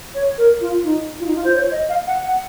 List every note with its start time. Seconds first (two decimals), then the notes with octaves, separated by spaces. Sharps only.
0.15 C#5
0.38 A#4
0.61 F4
0.84 D#4
1.20 F4
1.27 D#4
1.35 F4
1.44 C5
1.55 C#5
1.72 D#5
1.89 F5
2.07 F#5
2.23 F#5